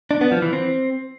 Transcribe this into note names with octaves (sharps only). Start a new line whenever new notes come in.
D4
B3
F3
E3
C4